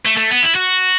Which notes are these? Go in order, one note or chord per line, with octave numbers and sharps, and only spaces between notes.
A3
A3
B3
E4
F#4